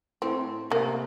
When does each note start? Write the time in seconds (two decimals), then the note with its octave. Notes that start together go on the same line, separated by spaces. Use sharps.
0.22 A2 C4
0.70 C3 A#3